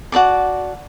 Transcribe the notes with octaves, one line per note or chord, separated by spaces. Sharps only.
F#4 D5 A5 D6